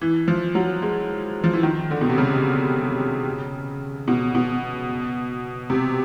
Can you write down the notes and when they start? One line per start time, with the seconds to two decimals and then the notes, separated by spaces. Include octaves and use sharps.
0.01 E3
0.28 F3
0.55 F#3
0.82 G#3
1.44 F3
1.53 E3
1.63 D#3
1.91 D3
2.01 B2
2.10 C3
2.18 C#3
4.08 B2
4.35 B2
5.70 C3